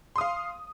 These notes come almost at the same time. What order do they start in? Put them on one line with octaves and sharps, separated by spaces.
C6 D#6 F5